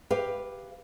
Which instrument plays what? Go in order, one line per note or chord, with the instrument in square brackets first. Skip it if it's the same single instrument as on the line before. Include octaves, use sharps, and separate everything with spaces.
[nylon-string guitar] G4 B4 F5